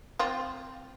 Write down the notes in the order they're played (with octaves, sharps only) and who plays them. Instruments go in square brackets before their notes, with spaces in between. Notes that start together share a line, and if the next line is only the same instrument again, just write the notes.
[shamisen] C4 F4